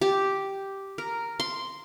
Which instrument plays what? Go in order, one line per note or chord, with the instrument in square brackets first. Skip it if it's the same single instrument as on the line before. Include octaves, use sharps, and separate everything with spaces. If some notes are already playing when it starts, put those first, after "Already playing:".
[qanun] G4
A#4
C6